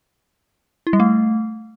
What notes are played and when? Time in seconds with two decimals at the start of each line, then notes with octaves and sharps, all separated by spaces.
0.87 E4
0.93 G3
1.00 A3